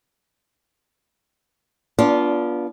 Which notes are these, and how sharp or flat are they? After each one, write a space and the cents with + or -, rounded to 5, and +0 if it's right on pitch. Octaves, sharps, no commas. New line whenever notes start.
B3 -30 D4 -15 F4 +0